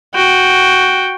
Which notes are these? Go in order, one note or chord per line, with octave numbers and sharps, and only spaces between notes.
F#4 G5